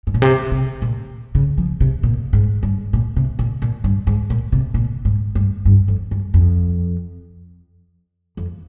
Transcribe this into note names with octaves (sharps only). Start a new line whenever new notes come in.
G#2
A#2
C3
C3
A#2
C#3
F3
C3
A#2
G#2
G2
A#2
C3
A#2
A#2
G2
G#2
A#2
C3
A#2
G#2
G2
G2
F2
G2
F2
F2